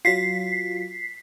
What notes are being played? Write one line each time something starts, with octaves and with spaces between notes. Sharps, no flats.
F#3 F4 B6 C7